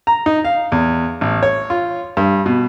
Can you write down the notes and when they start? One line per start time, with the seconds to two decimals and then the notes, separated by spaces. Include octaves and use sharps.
0.07 A#5
0.26 D#4
0.45 F5
0.72 E2
1.21 A1
1.43 C#5
1.70 F4
2.17 G2
2.46 B2